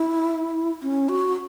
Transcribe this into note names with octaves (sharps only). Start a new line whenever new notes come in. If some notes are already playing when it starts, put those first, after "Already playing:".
Already playing: E4
C#4
F#4